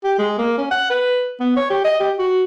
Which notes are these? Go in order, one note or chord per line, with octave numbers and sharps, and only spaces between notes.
G4
G#3
A#3
C#4
F#5
B4
B3
C#5
G4
D#5
G4
F#4